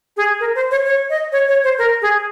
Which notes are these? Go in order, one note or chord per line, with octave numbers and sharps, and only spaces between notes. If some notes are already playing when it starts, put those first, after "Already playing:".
G#4
A#4
C5
C#5
C#5
D#5
C#5
C#5
C5
A#4
G#4